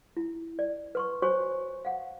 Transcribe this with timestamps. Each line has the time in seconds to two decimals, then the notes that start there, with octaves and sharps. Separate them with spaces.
0.17 E4
0.59 D5
0.95 B4 C6 C#6
1.22 F#4 C5 C#5 G#5 C6 C#6
1.85 F5 F#5